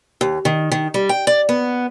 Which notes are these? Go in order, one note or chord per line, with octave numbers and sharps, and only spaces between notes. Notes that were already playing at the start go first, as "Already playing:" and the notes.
D#2
D#3
D#3
G3
G5
D5
B3